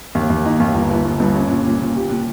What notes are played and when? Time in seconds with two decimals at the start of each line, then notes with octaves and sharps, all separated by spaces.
0.15 D#2
0.30 D#2
0.46 D#4
0.60 D#2
0.75 G1
0.91 G1
1.06 G1
1.20 G2
1.35 C#4
1.51 A#2
1.66 A#2
1.81 A#2
1.96 G4
2.11 A#2